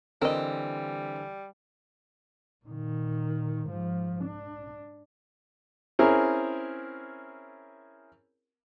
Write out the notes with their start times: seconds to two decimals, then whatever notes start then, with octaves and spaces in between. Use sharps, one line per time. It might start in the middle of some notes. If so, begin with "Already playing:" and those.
0.22 D3 E3 G3 C4 A#4 D#5
2.65 A#2 D#3
3.67 G#2 F3
4.25 D4
5.99 C4 C#4 E4 G#4 A#4